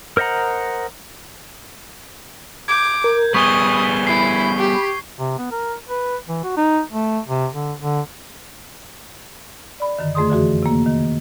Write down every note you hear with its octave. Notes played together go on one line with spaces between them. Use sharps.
A#4 C5 D#5 F#5 A#5
D6 G6 G#6
A#4
G3 B3 G#4 B5 C#6 D#6 G7
E4 C7
G4
C3
B3
A#4
B4
E3
F#4
D#4
A3
C3
D3
D3
D5 B5
F#2 D3 D#3
F2 A3 G#4 C6 D#6
D3 E3 F#4 G#4
C3 A#3
D#3